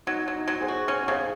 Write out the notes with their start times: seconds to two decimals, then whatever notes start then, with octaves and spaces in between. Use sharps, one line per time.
0.07 F#3 D#4
0.28 F#3
0.35 D#4
0.48 F#3
0.61 G#4 C5
0.68 F#4
0.88 C#4
1.08 C#3 G#4 C5